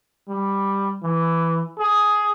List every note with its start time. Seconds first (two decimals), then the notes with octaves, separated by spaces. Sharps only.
0.28 G3
1.03 E3
1.79 G#4